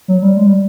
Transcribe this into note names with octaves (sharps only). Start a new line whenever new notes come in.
F#3
G3
G#3
G3